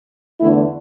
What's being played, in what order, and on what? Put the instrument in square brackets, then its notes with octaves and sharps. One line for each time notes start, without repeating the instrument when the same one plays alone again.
[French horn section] E2 D3 A3 E4